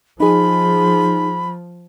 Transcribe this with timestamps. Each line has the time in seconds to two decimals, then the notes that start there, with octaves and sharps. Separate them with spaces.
0.20 F3 D#4 G#4 B5